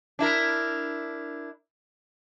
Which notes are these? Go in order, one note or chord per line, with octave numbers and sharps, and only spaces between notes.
D4 E4 A#4